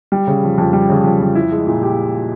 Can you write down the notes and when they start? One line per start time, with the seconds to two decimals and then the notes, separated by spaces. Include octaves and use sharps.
0.12 G3
0.27 C#3
0.43 F2
0.58 F2
0.73 G3
0.89 C#3
1.04 F2
1.21 F2
1.35 E4
1.52 G#3
1.67 A#2
1.83 G4